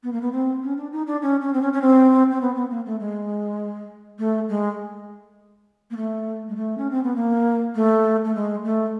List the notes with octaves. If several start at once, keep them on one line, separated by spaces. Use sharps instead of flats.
B3
A#3
B3
C4
C#4
D4
D#4
D4
C#4
C#4
C4
C#4
C#4
C4
C4
B3
B3
A#3
A3
G#3
A3
G#3
A#3
A3
G#3
A3
C#4
C4
B3
A#3
A3
A3
G#3
A3